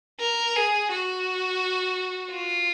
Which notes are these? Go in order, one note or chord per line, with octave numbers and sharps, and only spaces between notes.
A#4
G#4
F#4
F4